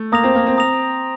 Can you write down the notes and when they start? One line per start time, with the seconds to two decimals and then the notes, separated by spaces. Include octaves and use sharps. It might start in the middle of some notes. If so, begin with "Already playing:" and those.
Already playing: A3
0.12 A#3 A#5 D#6 A#6 F7
0.23 C4
0.35 A#3
0.47 C4
0.57 A#5 D#6 A#6 F7